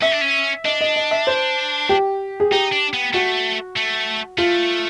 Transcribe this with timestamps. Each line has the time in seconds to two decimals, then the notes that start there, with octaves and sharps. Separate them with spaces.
0.02 C#4 E5
0.12 D4
0.21 C#4
0.65 D4 D#5
0.81 D#5
0.96 D#5
1.11 E5
1.27 C5
1.89 G4
2.40 G#4
2.51 D#4 G4
2.72 D4
2.94 B3
3.13 A3 F#4
3.76 A3
4.38 A3 F4